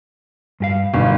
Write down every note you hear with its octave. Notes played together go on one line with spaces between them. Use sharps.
G2 G4 F5
G1 G2 B2 D#3